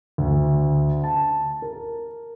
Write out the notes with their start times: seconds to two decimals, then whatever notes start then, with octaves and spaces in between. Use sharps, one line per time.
0.18 D2
1.04 A5
1.62 A#4